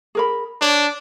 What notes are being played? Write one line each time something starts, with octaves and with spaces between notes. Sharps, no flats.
G#4 A#4 B5
D4 C#5